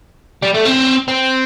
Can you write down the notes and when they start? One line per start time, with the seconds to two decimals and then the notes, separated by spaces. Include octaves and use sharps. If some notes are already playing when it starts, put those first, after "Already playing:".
0.42 G3
0.54 A3
0.65 C4
1.08 C4